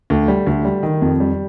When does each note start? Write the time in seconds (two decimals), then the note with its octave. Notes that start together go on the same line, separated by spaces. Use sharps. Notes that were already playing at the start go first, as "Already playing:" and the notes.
0.10 D2
0.28 G3
0.47 D2
0.65 G3
0.83 D#3
1.02 F2
1.20 G3